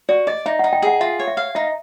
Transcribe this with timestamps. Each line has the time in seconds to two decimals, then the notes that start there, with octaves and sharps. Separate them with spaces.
0.09 F#4 D5
0.27 D5 D#5
0.46 D#4 E5
0.59 D#4 F#5
0.73 G5
0.82 G#4 F#5
1.01 F4 E5
1.19 C#5
1.28 E5
1.37 F5
1.55 D#4 E5